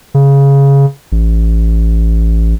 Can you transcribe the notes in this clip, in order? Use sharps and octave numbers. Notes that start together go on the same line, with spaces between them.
C#3
A1